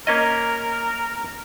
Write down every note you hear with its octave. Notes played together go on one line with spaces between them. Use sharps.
A#3 C#4 A#4 D#5